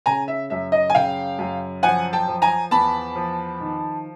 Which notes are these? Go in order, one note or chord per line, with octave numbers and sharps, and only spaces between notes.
C#3 G#5 A#5
E5
F#2 E5
D#5
G#5
C#3 F5 G5
F#2
F3 F#5 G#5
G5 A5
F3
G#5 A#5
E2 A5 B5
F3
D#3